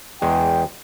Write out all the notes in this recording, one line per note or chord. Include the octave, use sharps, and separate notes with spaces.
E2 G#3 G5